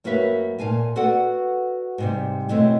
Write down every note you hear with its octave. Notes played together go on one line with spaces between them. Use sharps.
F#2 A#3 F#4 A#4 B4 E5
A#2 F5 G#5 A5
F#4 A4 B4 D5 F#5
G#2 C3 G3
F#2 B2 E3 G#3 A3 C4